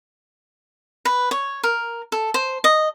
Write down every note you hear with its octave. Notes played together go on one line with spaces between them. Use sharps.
B4
C#5
A#4
A4
C5
D#5